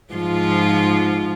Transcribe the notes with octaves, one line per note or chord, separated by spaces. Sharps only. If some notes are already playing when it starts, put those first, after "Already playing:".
G#2 F3 F4